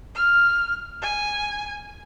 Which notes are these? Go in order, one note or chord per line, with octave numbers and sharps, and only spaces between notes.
F6
G#5